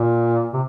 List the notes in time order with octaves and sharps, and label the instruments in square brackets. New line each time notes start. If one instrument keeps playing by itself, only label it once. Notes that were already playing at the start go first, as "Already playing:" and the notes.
Already playing: [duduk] A#2
C3